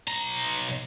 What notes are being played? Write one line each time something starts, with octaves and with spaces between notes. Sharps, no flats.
B1 A#5